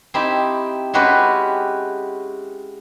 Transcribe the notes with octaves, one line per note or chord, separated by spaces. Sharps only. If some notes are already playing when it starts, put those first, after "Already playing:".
C4 D#4 E4 G4
G#3 C#4 E4 F#4 G4 B4